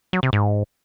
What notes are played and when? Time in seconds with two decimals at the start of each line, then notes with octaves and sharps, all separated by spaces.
0.13 F#3
0.23 C3
0.33 G#2